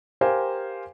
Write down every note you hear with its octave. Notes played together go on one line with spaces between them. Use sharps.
G4 A#4 C5 F5 G#5